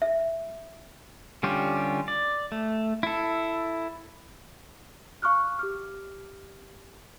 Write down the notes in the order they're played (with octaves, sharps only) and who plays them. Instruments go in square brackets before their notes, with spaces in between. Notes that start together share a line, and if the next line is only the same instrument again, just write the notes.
[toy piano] E5
[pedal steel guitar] D3 G3 C#4 F4 G4
D5
A3
E4 A4
[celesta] F5 C#6 D6 F6 F#6
G4 D6 F6